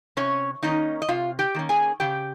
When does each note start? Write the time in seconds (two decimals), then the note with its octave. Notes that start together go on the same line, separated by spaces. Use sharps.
0.17 C3 C#4 C#5
0.63 D#3 A#3 C#4 D#4 D#5
1.02 D#5
1.08 C3 F4 F5
1.39 G4 G5
1.54 D#3 A#3 C#4
1.69 G#4 G#5
2.00 C#3 G4 G5